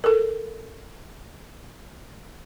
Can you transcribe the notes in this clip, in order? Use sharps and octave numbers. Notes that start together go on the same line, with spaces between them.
A4 A#4